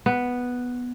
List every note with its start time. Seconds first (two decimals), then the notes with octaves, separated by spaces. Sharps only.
0.06 B3